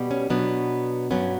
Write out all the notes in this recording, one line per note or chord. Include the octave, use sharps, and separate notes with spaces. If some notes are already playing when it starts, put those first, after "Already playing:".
Already playing: B2 G3 B3
C#4
B2 F#3 B3 D4
G2 F#3 B3 C#4